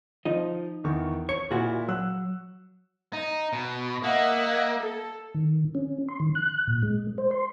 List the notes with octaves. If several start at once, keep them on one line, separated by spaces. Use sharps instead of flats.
F3 D#4 D#5
E2 D#3 C#6
C#5 C#6 C#7
A#2 E4 F#4 G#4
F#3 E6 F#6
D#4
B2
A#3 D#5 E5 F#5
A4
D#3
C#4
C6
D#3
F#6
A#2
G#3
C5
C6